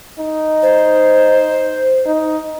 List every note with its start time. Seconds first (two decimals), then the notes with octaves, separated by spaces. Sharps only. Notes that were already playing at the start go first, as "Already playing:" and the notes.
0.19 D#4
0.62 C5
2.06 D#4